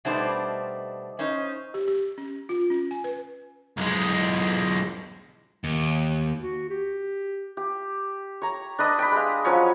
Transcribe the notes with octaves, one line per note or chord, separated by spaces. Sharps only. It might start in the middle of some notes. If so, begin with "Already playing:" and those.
B2 G3 A3 D4 D#4 C5
C#4 D#4 C5
G4
G4
C#4
F4
C#4
G#5
B4
B1 G#3
D#2
F#4
G4
G4
C#5 A#5
D4 B4 D#5
G5 B5
G#3 F5
F3 F#3 C#4 C#5